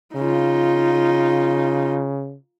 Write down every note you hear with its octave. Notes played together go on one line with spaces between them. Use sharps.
C#3 D#4 F4